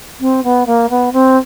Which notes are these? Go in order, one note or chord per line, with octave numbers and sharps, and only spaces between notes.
C4
B3
A#3
B3
C4